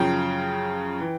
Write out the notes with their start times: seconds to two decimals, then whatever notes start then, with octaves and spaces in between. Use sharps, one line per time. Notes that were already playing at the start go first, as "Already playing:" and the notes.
Already playing: F#2 C#3 F3 G5
1.00 E3